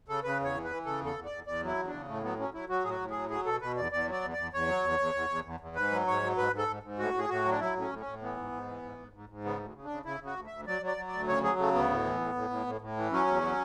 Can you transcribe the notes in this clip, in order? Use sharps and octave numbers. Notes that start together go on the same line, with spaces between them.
C#3 A4
C#3 B4
E2 C#5
E3
B4
E3
C#3 A4
E2
A4
E2
D5
E2
E2 D5
F#3
E4
E2
D4
C#3
A2 A3
F#3 B3
F#3 C#4
F#3 E4
F#3 F#4
A2 G#4
F#4
A2
G#4
F#3
F#3 G#4
B2 A4
B2 B4
E2 D5
E2 D5
F#3
D5
E2
E2 D5
E2 C#5
F#3
E2
E2
E2
E2
E2
E2
G#2 B4
F#3
G#2 C#5
F#3
G#2 B4
G#2
A4
G#2
G#2
A2 F#4
A2 G#4
A2 F#4
F#3
D4
F#3 E4
A2 C#4
A2
C#4
A2
E3 B3
G#2
G#2
E3
G#2
G#2
G#2
G#2
C#3 B3
D2
C#3
D4
C#3
C#3 E4
C#3
F#4
D2
D2 E5
F#3 D5
F#3
D5
F#3
D5
D2
C#3 C#5
F#3 G#4
C#3 A3
D2 B3
A2
E3
A2
A2
A2
A2
A2
E3
F#3 C#4
E2
F#3